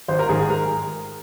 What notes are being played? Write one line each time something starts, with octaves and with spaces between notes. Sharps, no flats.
G#1 C5
A#4
G#2 D#3 G#4
G#4
A#4